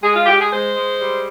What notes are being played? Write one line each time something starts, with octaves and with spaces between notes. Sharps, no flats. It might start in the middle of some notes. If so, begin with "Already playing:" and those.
G#3 G#4
F4
G#3 G4
G#4
G#3 C5
G#3
G3